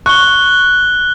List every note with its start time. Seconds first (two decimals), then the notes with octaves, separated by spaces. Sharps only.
0.06 C#6 F#6 G7